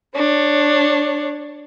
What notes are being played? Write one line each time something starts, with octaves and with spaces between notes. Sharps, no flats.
D4 C#5